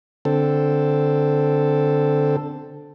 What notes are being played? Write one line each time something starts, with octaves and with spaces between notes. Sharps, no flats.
D3 C4 A4